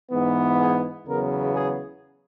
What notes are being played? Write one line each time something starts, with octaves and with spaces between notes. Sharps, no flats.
G#2 E3 B3
G#4
E2 C#3 F#3 B3 A#4
G#4